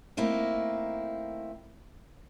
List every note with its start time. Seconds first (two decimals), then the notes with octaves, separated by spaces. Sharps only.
0.17 A3 A#3 C4 D#4 E4